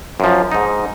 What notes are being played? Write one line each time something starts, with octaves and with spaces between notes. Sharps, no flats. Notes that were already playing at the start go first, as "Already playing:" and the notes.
F#2 F3
G#2 D#4